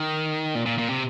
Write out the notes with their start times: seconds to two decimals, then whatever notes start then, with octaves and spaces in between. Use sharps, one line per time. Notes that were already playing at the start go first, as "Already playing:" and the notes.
Already playing: D#3
0.55 A#2
0.66 A#2
0.78 A#2
0.90 C3